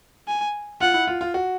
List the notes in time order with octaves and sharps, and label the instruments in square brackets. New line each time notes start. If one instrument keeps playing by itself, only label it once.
[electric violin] G#5
[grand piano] F4 [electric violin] F#5
[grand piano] E4
F4
F4
F#4